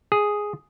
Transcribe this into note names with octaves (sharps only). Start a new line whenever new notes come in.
G#4